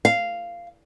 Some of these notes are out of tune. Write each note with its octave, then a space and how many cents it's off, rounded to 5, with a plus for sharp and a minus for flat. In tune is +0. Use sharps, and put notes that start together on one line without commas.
F5 -10